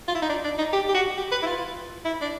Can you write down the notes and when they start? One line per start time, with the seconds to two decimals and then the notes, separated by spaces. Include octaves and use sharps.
0.08 F4
0.15 E4
0.22 D#4
0.29 D4
0.44 D4
0.58 D#4
0.73 G4
0.89 G4
0.95 F#4
1.17 G4
1.32 B4
1.42 E4
1.46 F4
2.05 E4
2.22 D4